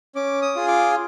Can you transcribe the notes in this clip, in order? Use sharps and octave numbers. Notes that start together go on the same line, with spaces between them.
C#4 D6
D#6
F4 G#4
D6